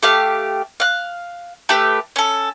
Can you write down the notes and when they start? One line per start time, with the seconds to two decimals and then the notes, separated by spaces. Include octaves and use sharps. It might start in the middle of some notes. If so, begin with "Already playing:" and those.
0.03 A3 G4 F5
0.80 F5 F#6
1.69 A3 G4 B4
2.16 C#4 A4